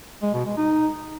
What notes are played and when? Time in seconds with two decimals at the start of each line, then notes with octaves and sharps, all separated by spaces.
0.23 G#3
0.34 B2
0.46 G#3
0.57 D#4